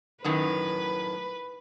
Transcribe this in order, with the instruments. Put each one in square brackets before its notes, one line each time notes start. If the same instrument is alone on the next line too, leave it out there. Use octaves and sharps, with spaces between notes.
[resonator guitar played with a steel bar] F#2 A2 D#3 [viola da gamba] B4